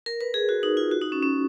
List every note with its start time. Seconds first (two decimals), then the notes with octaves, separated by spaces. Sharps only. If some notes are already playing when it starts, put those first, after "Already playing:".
0.06 A#4
0.21 B4
0.34 G#4
0.49 F#4
0.63 D#4
0.77 F4
0.91 F#4
1.01 D#4
1.12 C#4
1.23 C#4